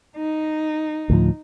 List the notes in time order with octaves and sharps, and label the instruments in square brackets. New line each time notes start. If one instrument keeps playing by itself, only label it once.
[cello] D#4
[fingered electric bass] D2 A2 F3